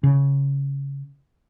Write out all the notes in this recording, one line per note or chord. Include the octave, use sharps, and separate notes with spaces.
C#3